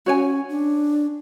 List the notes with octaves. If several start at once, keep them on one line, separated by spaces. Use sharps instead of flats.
C#4 F#4 C#5 G#5
D4